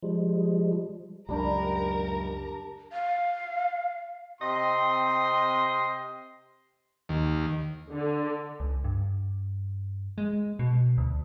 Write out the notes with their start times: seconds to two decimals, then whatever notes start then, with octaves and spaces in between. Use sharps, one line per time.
0.02 F3 G3 G#3
1.29 C#2 F#2 G3 D4 G4 A#4 A#5
2.93 F5
4.41 C3 C4 D#5 C6
7.09 D#2
7.93 D3
8.60 C#2
8.84 G2
10.18 G#3
10.59 B2
10.98 D2